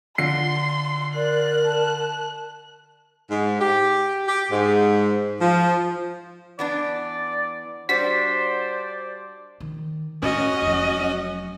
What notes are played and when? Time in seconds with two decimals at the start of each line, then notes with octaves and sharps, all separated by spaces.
0.18 D3 F4 C6 C7
1.15 A#4 D5 F#6
1.64 A5
3.30 G#2
3.60 G4
4.27 G4
4.52 G#2
5.41 F3
6.59 E3 B3 D4 D5
7.89 G3 D4 F#4 C5 D5 B6
9.60 D#3
10.22 A2 C#4 F#4 D#5
10.62 F1 F#3